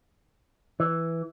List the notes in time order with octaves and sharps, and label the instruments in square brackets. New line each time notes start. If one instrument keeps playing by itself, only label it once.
[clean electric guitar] E3